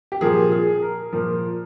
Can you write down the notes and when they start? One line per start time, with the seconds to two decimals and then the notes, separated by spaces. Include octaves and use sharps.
0.12 G4
0.21 A#2 F3 A#3 G#4
0.52 G#4
0.82 A#4
1.13 A#2 F3 A#3